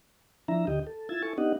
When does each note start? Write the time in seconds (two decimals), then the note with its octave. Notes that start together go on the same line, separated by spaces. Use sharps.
0.48 F3 D4 E4 E5 A#5
0.67 D2 D3 G4 D#5 G5
0.87 A4
1.09 E4 F4 E6 G#6 A6
1.23 E4 A4 G#5 A5 C#6
1.38 B3 D4 D#4 G4 D#5 F#5